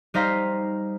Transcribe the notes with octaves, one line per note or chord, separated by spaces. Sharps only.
G3 D#4 C5 F5 A#5 B6